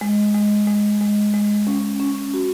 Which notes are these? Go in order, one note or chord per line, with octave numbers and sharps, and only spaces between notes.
G#3
G#3
G#3
G#3
G#3
C#4
C#4
F#4